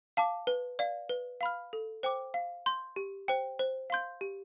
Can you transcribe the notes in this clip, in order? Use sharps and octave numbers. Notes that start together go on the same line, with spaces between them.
F5 A5 D6
B4
D5 F5
B4
F5 B5 F6
A4
C5 G5 D6
F5
C6 G6
G4
C5 G5
C5
F5 C6 G6
G4